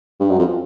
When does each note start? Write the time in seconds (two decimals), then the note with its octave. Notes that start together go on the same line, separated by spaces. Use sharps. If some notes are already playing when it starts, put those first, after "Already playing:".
0.20 G2
0.30 F#2
0.39 F2